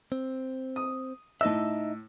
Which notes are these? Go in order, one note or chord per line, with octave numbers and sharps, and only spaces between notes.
C4
D#6
A2 D#4 D#5 E5 E6